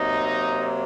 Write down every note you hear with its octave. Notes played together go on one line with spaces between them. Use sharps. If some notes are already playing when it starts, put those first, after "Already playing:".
Already playing: C3 F#3 A#3 D#4